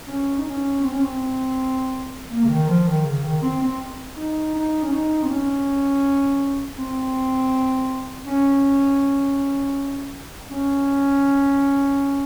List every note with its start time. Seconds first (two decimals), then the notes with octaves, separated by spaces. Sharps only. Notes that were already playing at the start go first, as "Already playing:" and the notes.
0.07 C#4
0.38 D#4
0.45 C#4
0.82 C4
0.92 C#4
1.01 C4
2.31 A#3
2.44 C#3
2.50 D#3
2.68 F3
2.87 D#3
3.05 C#3
3.24 D#3
3.42 C4
3.61 C4
4.17 D#4
4.54 D#4
4.82 C#4
4.91 D#4
5.22 C4
5.29 C#4
6.78 C4
8.26 C#4
10.50 C#4